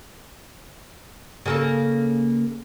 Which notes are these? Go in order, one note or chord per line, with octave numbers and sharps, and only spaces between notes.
C#3 A#3 A4